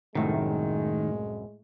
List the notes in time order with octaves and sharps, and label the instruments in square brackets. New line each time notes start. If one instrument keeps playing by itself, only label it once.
[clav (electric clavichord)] C2 F#2 [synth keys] A2 A3 [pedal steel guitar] D#3 [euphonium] G#3